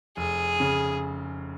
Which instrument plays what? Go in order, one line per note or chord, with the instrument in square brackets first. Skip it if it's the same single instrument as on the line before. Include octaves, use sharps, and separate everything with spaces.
[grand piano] F1 [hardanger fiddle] G#4
[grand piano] C#3